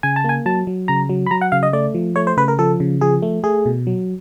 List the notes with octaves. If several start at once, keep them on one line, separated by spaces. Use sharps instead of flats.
C#3 G#5
A5
A#3 G#5
F#3 A5
F#3
C#3 A#5
F#3
B5
F#3 A#5
F#5
C#3 F5
D#5
A3 D5
F3
A3 C#5
C5
C#3 B4
A#4
F3 A4
C#3
F3 G#4
A3
A3 G#4
B2
F#3